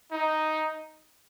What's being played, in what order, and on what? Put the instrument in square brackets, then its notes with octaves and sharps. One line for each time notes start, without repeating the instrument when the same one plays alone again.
[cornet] D#4